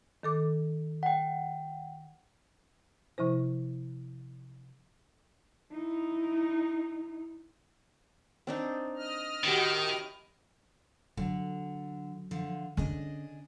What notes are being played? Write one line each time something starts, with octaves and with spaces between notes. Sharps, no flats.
D#3 A4 D6
F#5 G5
C3 F3 E4 C5
D#4 E4
C4 D4 D#4
D#5 F6
A2 D#3 F#4 G4
D3 F#3
D3 F3
D3 C#4 D4 G#4 D#5